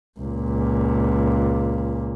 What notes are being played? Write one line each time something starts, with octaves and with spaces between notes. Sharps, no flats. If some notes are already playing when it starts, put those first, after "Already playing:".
C#2 A#2